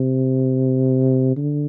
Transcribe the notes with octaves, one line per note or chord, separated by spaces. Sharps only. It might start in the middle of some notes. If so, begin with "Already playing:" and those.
Already playing: C3
D3